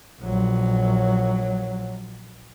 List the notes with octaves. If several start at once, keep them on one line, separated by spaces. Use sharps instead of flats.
A#1 F#3